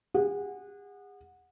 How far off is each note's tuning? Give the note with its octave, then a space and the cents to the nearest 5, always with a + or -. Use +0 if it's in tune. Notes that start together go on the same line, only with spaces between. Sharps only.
G#4 -40 F#5 -15